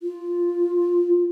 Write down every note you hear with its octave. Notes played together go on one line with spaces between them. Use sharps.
F4